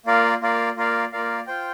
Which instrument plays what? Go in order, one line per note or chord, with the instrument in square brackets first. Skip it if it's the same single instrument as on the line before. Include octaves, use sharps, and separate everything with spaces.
[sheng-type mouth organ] A#3 F4 A#4 D5 F5
A#3 F4 A#4 D5 F5
A#3 F4 A#4 D5 F5
A#3 F4 A#4 D5 F5
F4 C5 G5